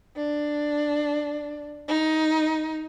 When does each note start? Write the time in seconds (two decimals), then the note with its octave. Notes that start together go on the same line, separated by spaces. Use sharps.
0.16 D4
1.88 D#4